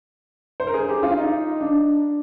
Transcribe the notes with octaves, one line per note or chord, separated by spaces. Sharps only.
C5
A#4
G#4
G4
F4
D#4
D4